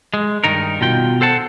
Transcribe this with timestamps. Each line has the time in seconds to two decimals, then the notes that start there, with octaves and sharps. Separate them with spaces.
0.14 G#3
0.44 G2 D#3 D#4 A#4
0.81 B2 F4 G5
1.21 A4 C5 F#5 A5